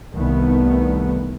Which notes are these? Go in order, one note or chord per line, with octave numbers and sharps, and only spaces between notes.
C2 D#3 A3 B3